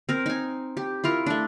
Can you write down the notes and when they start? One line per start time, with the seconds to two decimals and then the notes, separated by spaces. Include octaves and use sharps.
0.09 C4 A#4
0.26 D#4 G#5
0.77 G4
1.04 E4 F4 A#4
1.26 A3 D4